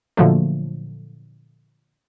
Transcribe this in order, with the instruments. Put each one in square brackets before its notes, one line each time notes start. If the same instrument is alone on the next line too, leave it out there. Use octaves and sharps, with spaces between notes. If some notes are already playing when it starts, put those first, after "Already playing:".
[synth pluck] A#2 D3 F3 F#3 A3